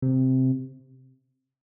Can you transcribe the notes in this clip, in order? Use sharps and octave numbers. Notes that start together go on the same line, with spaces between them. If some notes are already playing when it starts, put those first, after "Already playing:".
C3